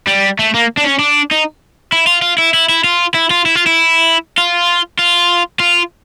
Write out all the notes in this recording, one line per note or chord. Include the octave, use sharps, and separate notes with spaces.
G3
A3
A#3
D4
C#4
D4
D#4
E4
F4
F4
E4
E4
E4
F4
E4
F4
E4
F4
E4
F4
F4
F4